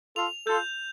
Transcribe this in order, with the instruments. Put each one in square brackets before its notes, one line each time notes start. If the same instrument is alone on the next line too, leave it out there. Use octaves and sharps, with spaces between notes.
[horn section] F4 A4 [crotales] F7
[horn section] F4 A4 [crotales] G6